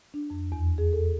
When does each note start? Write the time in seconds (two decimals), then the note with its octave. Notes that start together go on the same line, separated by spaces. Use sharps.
0.14 D4
0.30 F2
0.52 E2
0.78 G#4
0.93 A4